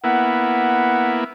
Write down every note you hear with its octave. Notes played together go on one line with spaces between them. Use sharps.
A#3 B3 E4 F#5